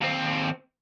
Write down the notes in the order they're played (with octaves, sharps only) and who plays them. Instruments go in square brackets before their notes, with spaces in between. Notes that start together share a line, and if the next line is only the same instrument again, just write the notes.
[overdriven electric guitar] D#2 C4